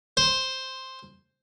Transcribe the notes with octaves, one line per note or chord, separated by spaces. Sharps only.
C5